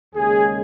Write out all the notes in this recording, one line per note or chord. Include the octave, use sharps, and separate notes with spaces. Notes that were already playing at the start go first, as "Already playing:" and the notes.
D#2 C#3 G#3 G#4